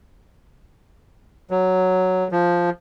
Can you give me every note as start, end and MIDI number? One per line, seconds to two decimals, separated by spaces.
1.51 2.28 54
2.32 2.70 53